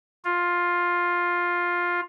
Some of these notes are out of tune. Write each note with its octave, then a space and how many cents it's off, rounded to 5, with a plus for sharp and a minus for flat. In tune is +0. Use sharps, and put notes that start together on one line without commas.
F4 +10